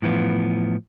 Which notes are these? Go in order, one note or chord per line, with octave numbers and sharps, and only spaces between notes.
A2 E3 F3 B3